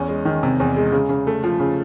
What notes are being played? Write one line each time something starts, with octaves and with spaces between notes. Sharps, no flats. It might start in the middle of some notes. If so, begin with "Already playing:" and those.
Already playing: E2 C#4
G#3
D#3
C3
E2
G#3
C#3
C#3
A3
F3
C#3